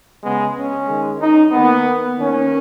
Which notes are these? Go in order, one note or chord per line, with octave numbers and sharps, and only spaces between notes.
C#3 G#3 B3
C#4
D#3 G#3
D#4
D#3 A#3 B3
D#3 A#3 C#4